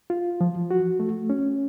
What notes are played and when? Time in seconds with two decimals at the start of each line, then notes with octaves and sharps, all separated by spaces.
0.10 F4
0.41 F3
0.71 F#4
1.00 A3
1.30 C#4